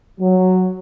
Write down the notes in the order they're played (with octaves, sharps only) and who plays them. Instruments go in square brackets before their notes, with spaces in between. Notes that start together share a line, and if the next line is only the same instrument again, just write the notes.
[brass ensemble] F#3